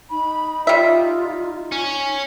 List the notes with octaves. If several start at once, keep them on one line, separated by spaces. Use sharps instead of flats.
D#4 B5
G3 F4 E5
C#4